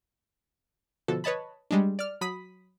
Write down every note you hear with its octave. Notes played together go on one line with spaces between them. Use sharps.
B2 D3 F3 F#4 A4
B4 C#5 D#5 A5 B5
G3 G#3 D4
D5 F6
F#3 B5 D#6 B6